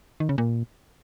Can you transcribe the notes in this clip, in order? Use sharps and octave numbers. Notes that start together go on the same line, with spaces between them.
D#3
C#3
A#2